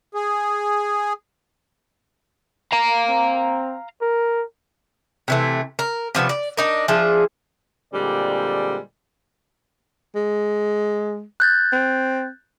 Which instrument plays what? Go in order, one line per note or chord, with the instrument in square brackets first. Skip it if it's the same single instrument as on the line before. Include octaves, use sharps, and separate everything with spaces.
[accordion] G#4
[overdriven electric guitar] F5 A#5
[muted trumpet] C4
A#4
[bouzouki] C3 E3 A3
A#4
C3 F3 B3 D4
D5
D4 D#4 A#4
F3 D4 G#4 E5
[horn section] A#2 D3 G3 G#3 C4 D5
[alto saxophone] G#3
[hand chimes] F#6 G6 A6
[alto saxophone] C4